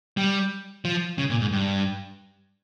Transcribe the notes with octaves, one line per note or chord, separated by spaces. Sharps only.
G3
F3
C#3
A#2
G#2
G2